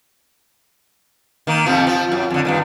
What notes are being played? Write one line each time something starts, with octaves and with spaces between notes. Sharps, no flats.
D#3 A#3
F2 C3 F3
F3
F#2
F2 D3
G2 A#2 D#3